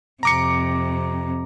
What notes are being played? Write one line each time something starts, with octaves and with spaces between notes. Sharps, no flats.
F2 C3 A#5 D6 C#7